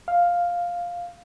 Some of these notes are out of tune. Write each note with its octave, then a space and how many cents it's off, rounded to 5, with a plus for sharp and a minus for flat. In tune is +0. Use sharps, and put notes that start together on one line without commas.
F5 +5